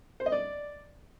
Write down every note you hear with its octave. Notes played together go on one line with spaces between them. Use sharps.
C5
D#5
D5